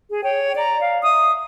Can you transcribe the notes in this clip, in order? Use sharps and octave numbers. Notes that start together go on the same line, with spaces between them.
G#4
C#5 G5
D5 A#5
F5
E5 D#6